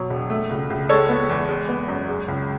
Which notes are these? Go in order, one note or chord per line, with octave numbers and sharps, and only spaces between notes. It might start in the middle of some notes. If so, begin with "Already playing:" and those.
Already playing: B2 F#3
E1
A3
C#2
C#2
G#3 A4 C#5
B3
E2
G#3
B3
F#2
G#3
C#2